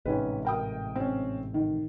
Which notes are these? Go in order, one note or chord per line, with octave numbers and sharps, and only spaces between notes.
A1 G#2 C3 C#4 D#4 B4
A#4 G5 D#6
C4 C#4
D#3